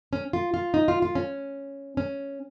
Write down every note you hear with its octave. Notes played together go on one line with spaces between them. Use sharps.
C#4
F4
F4
D#4
F4
F4
C#4
C#4